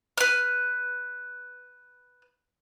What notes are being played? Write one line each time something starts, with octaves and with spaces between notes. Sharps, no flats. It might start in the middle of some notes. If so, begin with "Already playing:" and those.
B4 F6